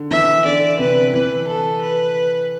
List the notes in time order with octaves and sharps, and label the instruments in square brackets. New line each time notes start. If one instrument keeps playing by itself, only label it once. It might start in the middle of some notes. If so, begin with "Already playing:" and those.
Already playing: [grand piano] D3
[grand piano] E3 [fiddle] E5
[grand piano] D3 [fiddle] D5
[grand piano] C3 [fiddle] B4
[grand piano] E3 [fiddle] B4
[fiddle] A4
B4